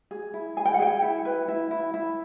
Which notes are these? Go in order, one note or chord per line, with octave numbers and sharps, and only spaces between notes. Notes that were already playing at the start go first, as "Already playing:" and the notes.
G#4
E4
G#4 G#5
G5
F#5
G#4 G5
E4
B4
E4
E4
E4